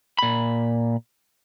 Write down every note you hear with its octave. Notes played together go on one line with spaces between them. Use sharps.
A#2 B5